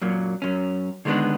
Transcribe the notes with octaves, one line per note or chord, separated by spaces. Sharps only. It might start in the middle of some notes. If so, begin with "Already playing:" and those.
F#2 A#2 F#3
F#2 C#4
D3 D#3 G#3 B3 D4